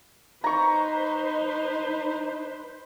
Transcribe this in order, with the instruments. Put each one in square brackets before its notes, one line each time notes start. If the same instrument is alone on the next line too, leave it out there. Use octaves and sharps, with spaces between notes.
[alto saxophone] D#4 [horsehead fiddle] B4 C5 [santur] A#5 C#6